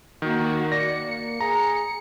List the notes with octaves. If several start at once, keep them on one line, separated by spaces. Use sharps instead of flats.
D#3 A#3 F#4
D5 A#6 C#7
A#3
G#4 A#5